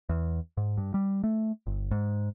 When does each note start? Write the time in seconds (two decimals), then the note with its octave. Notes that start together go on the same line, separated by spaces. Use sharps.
0.09 E2
0.57 G#2
0.77 G2
0.94 G3
1.24 A3
1.67 G1
1.91 G#2